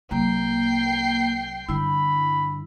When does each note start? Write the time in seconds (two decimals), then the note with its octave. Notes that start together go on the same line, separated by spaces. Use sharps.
0.11 C2 F#3 A#3 G5 C7
1.69 G2 D3 E4 B5